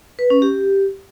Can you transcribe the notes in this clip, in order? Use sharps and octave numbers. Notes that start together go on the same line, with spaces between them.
B4
C#4
G4